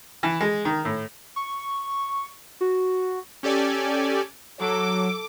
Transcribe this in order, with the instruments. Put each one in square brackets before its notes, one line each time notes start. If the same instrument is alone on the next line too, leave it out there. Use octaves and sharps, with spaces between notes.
[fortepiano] E3
G#3
D#3
A2
[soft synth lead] C#6
F#4
[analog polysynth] C#4 G4 A4 D5 G#5
[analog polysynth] F#3 [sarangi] A4 [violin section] D6